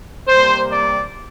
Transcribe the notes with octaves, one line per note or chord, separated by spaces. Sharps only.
C3 G3 A#3 C5
D5